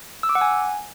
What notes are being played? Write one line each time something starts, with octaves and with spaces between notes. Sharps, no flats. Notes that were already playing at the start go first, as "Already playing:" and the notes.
E6
D6
F#5
G#5